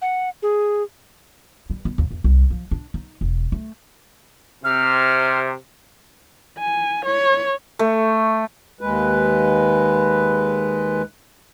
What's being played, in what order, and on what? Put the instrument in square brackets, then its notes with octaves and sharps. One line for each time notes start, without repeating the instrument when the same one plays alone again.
[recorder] F#5
G#4
[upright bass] G3
B3
D#2
E2
C2
F3
D4
D#4
E1
A3
[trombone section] C3 [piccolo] F6
[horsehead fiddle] G#5
C#5
[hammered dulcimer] A3
[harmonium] D#2 G#3 B4